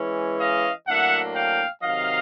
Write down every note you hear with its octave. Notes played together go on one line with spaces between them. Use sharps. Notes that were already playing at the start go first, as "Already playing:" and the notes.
Already playing: E3 G#3 C#4
D#5 F5
A2 F#3 A#3 D4 E5 F#5
F5 G5
C3 D#3 F#3 D#5 F5